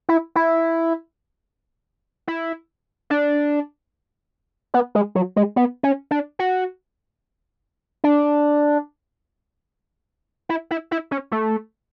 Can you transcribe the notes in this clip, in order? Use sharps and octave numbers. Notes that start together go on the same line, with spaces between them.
E4
E4
E4
D4
B3
G#3
F#3
G#3
B3
C#4
D4
F#4
D4
E4
E4
E4
C#4
A3